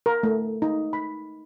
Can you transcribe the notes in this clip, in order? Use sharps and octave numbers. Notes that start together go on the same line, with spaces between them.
A#4
A3
D#4
B5